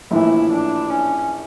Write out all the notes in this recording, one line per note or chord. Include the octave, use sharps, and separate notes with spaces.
A#1 A2 E3 E4
D4
C#4